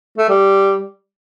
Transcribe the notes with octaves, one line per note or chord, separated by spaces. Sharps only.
A3
G3